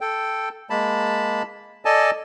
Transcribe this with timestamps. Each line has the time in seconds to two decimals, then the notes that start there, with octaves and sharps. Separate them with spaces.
0.01 A4 G5
0.70 G#3 A#3 A5 B5
1.85 A4 D5 D#5 G#5 A5